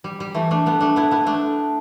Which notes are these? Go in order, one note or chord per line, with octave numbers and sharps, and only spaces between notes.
G3
G3
E3 A3
A3 D4
G3 B3
A3 D4
B3 E4
B3 E4
A3 D4